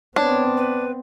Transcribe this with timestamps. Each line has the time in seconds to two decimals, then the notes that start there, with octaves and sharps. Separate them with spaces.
0.16 B3 C4 D4 C#5
0.57 B4